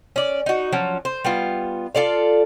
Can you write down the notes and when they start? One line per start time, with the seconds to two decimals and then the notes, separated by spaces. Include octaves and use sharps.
0.16 C#4 D5
0.46 D#4 F#4
0.72 F3 F#3 C#4
1.05 C5
1.24 G3 B3 F4
1.95 F4 A4 D5 F5